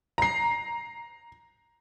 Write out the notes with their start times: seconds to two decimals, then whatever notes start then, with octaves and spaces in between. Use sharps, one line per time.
0.18 A#5 C7